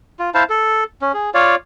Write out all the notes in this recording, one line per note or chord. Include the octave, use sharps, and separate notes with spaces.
F4
E4 C5 F5 A5
A4
C#4
G#4
F4 C#5 D5 F5